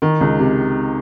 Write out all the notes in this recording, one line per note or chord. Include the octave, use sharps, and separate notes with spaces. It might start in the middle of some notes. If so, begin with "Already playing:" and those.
D#3
C#2
C3